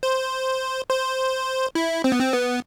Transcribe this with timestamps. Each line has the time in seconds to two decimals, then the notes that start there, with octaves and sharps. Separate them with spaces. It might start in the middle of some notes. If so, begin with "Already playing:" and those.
0.03 C5
0.89 C5
1.75 E4
2.04 C4
2.12 B3
2.20 C4
2.33 B3